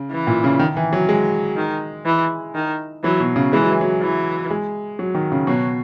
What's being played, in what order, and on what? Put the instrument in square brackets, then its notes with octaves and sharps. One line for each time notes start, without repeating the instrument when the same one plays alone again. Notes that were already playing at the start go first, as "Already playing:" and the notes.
Already playing: [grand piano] C#3
[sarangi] E3
[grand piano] A#2
C#3
D#3
E3
F#3
G#3
[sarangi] D#3
E3
D#3
[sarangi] E3 [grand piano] F#3
[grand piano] B2
C#3
[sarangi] E3 [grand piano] G#3
[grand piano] F#3
E3
F#3
[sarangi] E3
[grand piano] G#3
F#3
D#3
C#3
[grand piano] B2 [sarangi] F#3